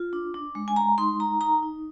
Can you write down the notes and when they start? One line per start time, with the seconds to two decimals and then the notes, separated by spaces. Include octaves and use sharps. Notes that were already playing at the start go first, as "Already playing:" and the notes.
Already playing: F4
0.13 D4
0.34 D4
0.55 G#3
0.68 G#5
0.76 G#3 A#5
0.98 D#4 C6
1.20 D#4 A#5
1.41 D#4 A#5
1.63 D#4